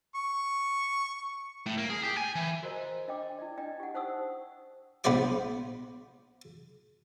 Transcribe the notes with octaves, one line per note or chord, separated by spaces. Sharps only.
C#6
A2
A#3
G#4
G4
G#5
E3
F#4 A#4 C5 D#5 A#5
D4 D#5 G5 D6
E4 D5
D4 D5 D#5 G5
G4 F#5
D#4 C5 F#5 C#6 D#6 E6
A#1 B3 B4 C5 D5 D6